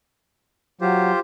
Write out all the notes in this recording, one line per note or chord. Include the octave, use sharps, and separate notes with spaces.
F#3 F4 G4 C5